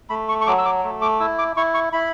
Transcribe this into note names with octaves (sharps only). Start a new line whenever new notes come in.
A3 B5
C#6
C#6
F#3 D6
E6
D6
A3
D6
E4 E6
D6
E4 C#6
C#6
E4 B5